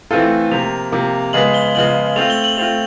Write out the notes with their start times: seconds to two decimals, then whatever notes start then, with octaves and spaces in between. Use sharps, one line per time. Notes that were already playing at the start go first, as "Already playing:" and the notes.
0.11 E3 A3 C4 F4 A4
0.51 C3 F3 A#3 F7
0.92 C3 F3 A#3
1.33 C#3 F3 G#3 B3 F#7
1.54 G7
1.75 C#3 F3 G#3 B3 F#7
2.16 A3 C4 F4 F7
2.30 G7
2.44 F#7
2.57 A3 C4 F4 F7